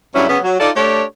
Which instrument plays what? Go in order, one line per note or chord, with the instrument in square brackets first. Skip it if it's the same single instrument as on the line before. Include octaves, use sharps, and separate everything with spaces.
[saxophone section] G2 C#3 F#3 C#4 E4
C#3 F#3 B3 C#4
F#3
D#4 F4 A4 D5
A3 D4 G4 A4 C#5